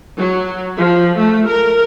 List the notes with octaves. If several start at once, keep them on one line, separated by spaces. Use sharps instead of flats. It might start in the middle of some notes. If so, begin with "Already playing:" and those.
F#3
F3
A3
A#4